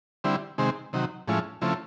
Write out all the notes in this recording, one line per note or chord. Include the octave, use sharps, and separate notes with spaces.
D3 G3 C4 E4
C3 D#3 G#3 C4
C3 D#3 F#3
A2 F3 G#3 C#4 E4
C#3 F3 A3 C4 E4